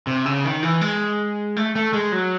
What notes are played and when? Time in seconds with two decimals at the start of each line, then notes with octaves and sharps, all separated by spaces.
0.07 C3
0.26 C#3
0.45 D#3
0.63 E3
0.81 G#3
1.57 A3
1.76 A3
1.93 G#3
2.12 F#3